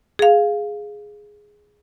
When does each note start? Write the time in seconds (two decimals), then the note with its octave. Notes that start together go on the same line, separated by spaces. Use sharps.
0.19 G#4 F5